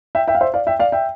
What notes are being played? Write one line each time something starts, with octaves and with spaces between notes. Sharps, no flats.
E5 G5
E5 G5
F5
C5 E5
D5 F5
E5 G5
D5 F5
E5 G5